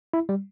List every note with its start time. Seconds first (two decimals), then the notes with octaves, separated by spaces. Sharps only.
0.14 E4
0.29 G3